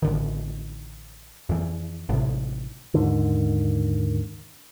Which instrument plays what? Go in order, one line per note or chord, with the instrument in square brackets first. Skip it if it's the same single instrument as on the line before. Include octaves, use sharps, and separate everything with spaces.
[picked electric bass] A1 D3 D#3
F2 E3
A1 C3
D#2 G#2 D3 D#3